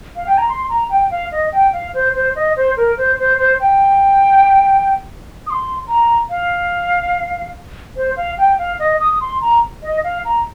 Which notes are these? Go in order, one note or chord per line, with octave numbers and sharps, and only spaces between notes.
F5
G5
A#5
C6
A#5
G5
F5
D#5
G5
F5
C5
C5
D#5
C5
A#4
C5
C5
C5
G5
D#6
C6
A#5
F5
C5
F5
G5
F5
D#5
D#6
C6
A#5
D#5
F5
A#5